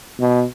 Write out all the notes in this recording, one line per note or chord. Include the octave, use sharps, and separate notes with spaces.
B2